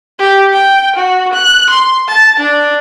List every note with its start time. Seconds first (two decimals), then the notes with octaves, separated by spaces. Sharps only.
0.19 G4
0.53 G5
0.96 F#4
1.33 F#6
1.70 C6
2.08 A5
2.39 D4